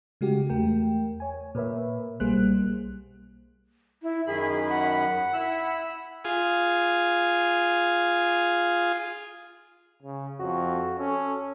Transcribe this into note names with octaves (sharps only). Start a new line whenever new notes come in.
C#3 G#3 F#4 G4
E2 A3 A#4 G5
C#5 G#5
A#2 A#4 B4 C#5 E5
B1 G3 A#3 G#4 C5 F#6
E4
F#2 D#3 G#4 B5
F#5
E4 B5 E6
F4 G#4
C#3
F2 F#4
C#4 A4